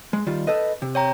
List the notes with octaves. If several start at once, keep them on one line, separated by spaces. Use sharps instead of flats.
G#3
D#3 G3 F4
A4 B4 D#5
C3
C#5 G5 A#5